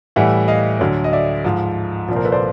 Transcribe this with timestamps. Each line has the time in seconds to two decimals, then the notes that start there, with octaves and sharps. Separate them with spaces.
0.16 A2 E3 G3 E5 F#5
0.48 D#5 F5
0.80 D2 D3 F#3
1.04 D#5
1.13 D5 E5
1.44 G#2 F3
2.09 C2 A#2 F3
2.16 A#4 C5
2.24 A4 B4
2.32 C5 D5